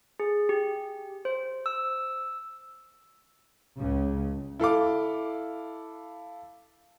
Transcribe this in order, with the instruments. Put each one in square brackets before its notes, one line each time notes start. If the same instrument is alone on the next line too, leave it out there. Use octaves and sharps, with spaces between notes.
[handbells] G#4
G4
C5
E6
[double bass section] C#2 C#3
[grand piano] E4 A4 F5 D6